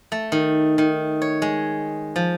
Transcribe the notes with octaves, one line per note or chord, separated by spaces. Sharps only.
A3
D#3
D#3
C#5
G#3
F3